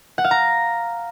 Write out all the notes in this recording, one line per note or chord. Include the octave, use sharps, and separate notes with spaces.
F#5
F5
A#5